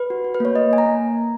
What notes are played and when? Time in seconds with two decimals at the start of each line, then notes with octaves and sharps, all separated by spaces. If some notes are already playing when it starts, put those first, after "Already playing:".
Already playing: B4
0.10 F#4
0.24 F#4
0.34 B4
0.40 A#3 C#5
0.55 A#3 D#5
0.71 A#3 G#5
0.78 A#5
0.86 A#3